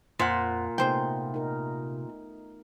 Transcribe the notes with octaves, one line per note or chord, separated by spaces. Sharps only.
F2 A#2 F4 C5 F#5
C3 A3 B3 D#4 G#4 C5 G5
D#4 A#4